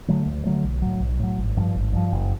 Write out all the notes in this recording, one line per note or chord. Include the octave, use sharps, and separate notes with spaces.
D3 F#3 A3
D2
D3 F#3 A3
B1
A2 F#3
B1
A2 F#3
G#1
G2 D3 F3
G#1
G2 D3 F3
F#1